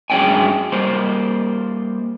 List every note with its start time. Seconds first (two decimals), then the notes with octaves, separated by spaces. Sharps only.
0.10 G2 F#3 G#3 C#4 G5 G#5
0.72 G3 A#3 C5